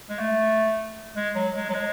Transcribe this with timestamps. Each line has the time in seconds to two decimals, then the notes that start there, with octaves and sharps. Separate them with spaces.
0.09 G#3
0.19 A3
1.16 G#3
1.36 F#3
1.55 G#3
1.69 F#3
1.74 G#3